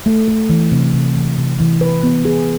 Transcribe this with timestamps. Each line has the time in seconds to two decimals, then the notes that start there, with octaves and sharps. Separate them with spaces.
0.06 A3
0.28 A3
0.50 E3
0.72 C3
0.94 C3
1.16 E3
1.38 C3
1.60 E3
1.81 B4
2.03 B3
2.25 G#4